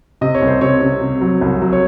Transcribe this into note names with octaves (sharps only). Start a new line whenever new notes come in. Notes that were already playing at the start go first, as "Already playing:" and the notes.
C3 D#5
C#5
C2
C5
C3 C#5
C3
C3
F#3
C2
F#3
C#5